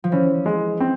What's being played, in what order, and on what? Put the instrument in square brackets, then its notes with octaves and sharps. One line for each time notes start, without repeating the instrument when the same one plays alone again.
[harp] F3
[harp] E3 [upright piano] C#4
[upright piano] G#3
C4